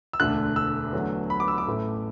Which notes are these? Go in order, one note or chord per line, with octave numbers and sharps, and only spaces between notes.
E6
E1 D2 D3 A3 F#6
E6
E2 D3 F#3 A3
B5
D6
E6
D6
A1 A2 A3